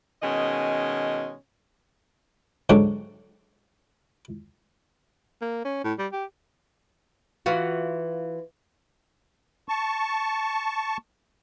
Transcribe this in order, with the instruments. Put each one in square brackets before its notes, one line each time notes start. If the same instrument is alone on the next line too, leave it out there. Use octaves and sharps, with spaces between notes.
[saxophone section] B2 D#3 G#3 C#4 D#5
[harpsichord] G#2 D3 F#3 D4 F#4
[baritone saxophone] A#3
C#4
A2
G3
G4
[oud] E3 F4 F#4
[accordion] A5 C#6